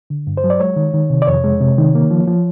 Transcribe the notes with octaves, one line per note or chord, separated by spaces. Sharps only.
D3
G2
C5
F#3
D5
G#3 C#5
D#3
D#3
C3
D5
F2 C#5
G#3
C3
D#3
A#3
F3
F3